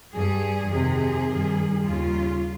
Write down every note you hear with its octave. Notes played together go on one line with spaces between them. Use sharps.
G2 G3 G#4
F2 C3 D#3 G#4
G2 D#3 G3
D#2 C#3 G3 F4